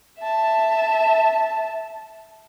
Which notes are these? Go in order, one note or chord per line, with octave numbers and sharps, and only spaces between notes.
E5 A5